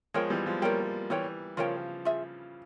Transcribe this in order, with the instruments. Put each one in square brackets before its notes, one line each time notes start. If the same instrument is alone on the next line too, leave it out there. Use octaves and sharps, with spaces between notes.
[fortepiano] F3 G#3 [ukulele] F4 A#4 C#5 G5
[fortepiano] E3 G3
F3 G#3
[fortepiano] G3 A#3 [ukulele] F4 A#4 C#5 G5
[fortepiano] E3 G3 [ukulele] F4 A#4 C#5 G5
[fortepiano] C#3 F3 [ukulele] F4 A#4 C#5 G5
[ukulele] F4 G#4 E5